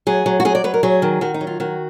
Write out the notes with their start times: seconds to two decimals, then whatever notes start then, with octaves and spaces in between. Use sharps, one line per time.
0.07 F#3 G#4
0.26 F#3
0.40 F#4
0.45 F#3 G#4
0.55 D5
0.64 F#3 B4
0.74 A#4
0.83 F#3 G#4
1.02 D#3
1.21 D#3 F#4
1.34 D#4
1.41 F#3
1.47 F4
1.60 D#3 F#4